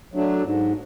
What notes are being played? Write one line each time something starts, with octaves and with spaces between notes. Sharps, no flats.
F#3 A3 D4
G#2